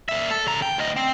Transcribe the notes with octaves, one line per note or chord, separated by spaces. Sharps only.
A#2 E5
A4
C#3 A#5
G5
D2 D#5
C4